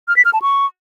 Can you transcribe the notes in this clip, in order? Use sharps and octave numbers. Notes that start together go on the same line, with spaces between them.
F6
B6
F6
A5
C#6